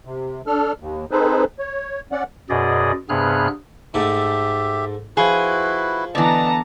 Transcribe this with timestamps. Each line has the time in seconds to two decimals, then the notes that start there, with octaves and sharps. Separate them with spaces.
0.05 C3
0.47 D4 A4 F6
0.80 D#2
1.11 C4 D#4 G#4 A4 B4 C5
1.59 C#5
2.12 C#4 D5 F#5
2.49 F#2 B2 G#4 D5 D#5
3.09 G2 C3 B3 G#4 F6 F#6
3.94 G#2 A3 G4 E5
5.17 F3 E4 F#4 G#4 B4
6.15 D3 E3 B3 D5 D#5 A5 A#5